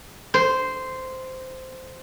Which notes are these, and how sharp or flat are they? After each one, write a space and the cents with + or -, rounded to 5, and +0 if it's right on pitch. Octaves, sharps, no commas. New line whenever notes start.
C5 -10